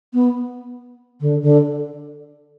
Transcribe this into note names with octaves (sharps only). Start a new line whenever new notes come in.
B3
D3
D3